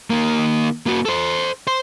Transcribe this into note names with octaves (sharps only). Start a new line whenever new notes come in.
D#3 A#3
A#3 F#4
A4 C5
C5